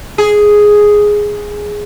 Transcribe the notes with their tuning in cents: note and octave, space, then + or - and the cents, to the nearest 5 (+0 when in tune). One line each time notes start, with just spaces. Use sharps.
G#4 +0